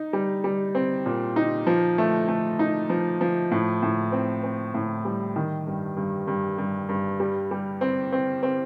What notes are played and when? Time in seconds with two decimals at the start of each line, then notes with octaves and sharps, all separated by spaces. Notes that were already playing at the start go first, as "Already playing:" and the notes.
Already playing: D#4
0.13 G3
0.44 G3
0.75 C4
1.06 A#2
1.36 D#4
1.67 F3
1.98 A3
2.28 A3
2.59 D#4
2.90 F3
3.21 F3
3.51 A2
3.82 A2
4.12 C4
4.43 C4
4.74 A2
5.05 G3
5.36 D#3
5.67 G2
5.97 G2
6.28 G2
6.58 G2
6.89 G2
7.20 G3
7.51 G3
7.81 C4
8.12 C4
8.43 C4